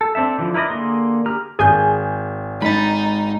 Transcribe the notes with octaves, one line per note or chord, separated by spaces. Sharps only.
A4
C4 D4 A4 E5
D3 E3 F3
E4 A#4 B4 D5 D#5
D3 A#3 G#4 C6
G4 G#4 A#5 F6
G#1 G#4 G#5 G6
G#2 D#4 B5 A6